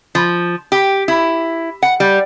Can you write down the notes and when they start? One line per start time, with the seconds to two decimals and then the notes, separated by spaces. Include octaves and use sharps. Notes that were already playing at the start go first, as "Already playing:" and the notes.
0.15 F3
0.72 G4
1.08 E4
1.83 F#5
2.00 G3